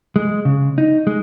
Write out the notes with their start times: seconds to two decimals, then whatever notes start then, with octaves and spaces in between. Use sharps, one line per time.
0.16 G#3
0.45 C#3
0.78 D#4
1.07 G#3